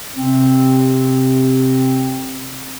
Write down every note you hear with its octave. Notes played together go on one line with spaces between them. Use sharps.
C3 C4